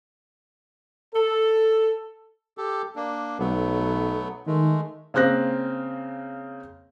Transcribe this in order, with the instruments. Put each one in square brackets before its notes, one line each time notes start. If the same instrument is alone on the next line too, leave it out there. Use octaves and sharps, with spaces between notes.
[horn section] A4
[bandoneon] G4 A4
A#3 D4
[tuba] B1 [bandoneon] F#3 A3 B3
[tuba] D#3 [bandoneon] G#3 A3
[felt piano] C#3 A#3 C4 F#6 A#6